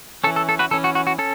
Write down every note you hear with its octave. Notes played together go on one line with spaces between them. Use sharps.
E3 C#4 A4
A4
A4
F#4 B4
E3 C#4 A4
F#4
F#4
F#4
C#4 A4